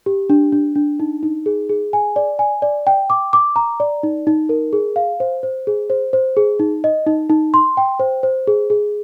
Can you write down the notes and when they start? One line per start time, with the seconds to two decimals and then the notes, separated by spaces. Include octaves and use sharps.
0.06 G4
0.30 D4
0.52 D4
0.75 D4
1.00 D#4
1.23 D#4
1.46 G#4
1.69 G#4
1.93 G#5
2.16 D5
2.39 G#5
2.62 D5
2.87 G5
3.10 D6
3.33 D6
3.56 A#5
3.80 D5
4.03 D#4
4.27 D#4
4.49 A#4
4.73 G#4
4.96 F5
5.20 C5
5.43 C5
5.67 G#4
5.90 C5
6.13 C5
6.37 G#4
6.60 D#4
6.84 D#5
7.07 D#4
7.30 D#4
7.54 C6
7.77 G5
8.00 C5
8.23 C5
8.47 G#4
8.70 G#4